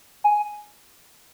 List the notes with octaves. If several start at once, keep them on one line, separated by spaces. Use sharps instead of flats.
G#5